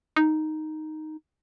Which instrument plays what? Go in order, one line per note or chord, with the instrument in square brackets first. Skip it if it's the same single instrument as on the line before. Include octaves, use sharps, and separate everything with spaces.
[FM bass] D#4